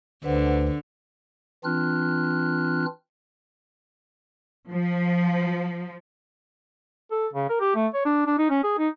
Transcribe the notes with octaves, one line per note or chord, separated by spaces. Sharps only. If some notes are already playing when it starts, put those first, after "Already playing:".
D2 D3 B4 C5 F#5
E3 C4 D4 F4 F6 F#6
F3
A4
C#3
A#4
G4
A3
C#5
D4
D4
D#4
C#4
G#4
D#4